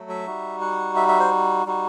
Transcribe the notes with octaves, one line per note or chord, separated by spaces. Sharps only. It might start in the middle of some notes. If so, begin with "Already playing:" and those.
Already playing: F#3 A3
E5
G3 D#4 F#4
F#5
E5
E5
C5
G3 D#4 F#4